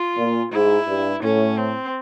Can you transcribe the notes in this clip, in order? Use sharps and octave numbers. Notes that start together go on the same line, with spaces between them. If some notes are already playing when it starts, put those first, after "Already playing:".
Already playing: F4
A#2
G#2 E4
G2
A2 C#4
C4